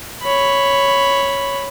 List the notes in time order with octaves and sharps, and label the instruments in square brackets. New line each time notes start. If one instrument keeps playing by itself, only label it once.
[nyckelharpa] C#5 B5